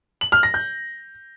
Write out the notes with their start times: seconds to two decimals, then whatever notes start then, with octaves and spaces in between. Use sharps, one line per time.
0.21 F#7
0.32 F6
0.43 A#6
0.54 G6